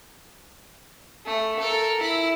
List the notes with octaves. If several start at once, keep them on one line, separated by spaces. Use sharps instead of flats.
A3
A4 A#4
E4